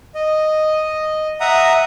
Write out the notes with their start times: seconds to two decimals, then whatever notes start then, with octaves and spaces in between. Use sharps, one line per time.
0.15 D#5
1.40 E5 F#5 A#5 D#6